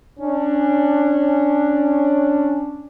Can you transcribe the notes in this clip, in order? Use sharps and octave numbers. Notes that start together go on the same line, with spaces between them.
C#4 D4